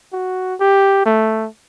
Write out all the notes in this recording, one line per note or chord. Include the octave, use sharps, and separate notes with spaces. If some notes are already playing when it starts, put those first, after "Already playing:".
F#4
G4
A3